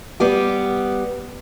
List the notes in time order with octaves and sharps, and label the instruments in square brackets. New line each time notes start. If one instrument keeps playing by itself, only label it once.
[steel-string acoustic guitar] G3 B3 G4